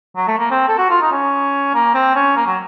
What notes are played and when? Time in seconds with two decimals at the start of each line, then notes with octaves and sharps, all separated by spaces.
0.16 F#3
0.27 A3
0.38 A#3
0.51 C4
0.68 A4
0.78 F#4
0.90 F4
1.01 D#4
1.12 C#4
1.74 A#3
1.94 C4
2.15 C#4
2.36 A#3
2.46 F#3